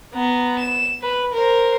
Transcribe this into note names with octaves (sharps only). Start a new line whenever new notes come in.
B3 A#5
E7
B4
A#4 C5